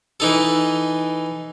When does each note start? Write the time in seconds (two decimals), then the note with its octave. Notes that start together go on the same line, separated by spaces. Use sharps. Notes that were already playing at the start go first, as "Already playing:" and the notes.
0.20 E3 D#4 A4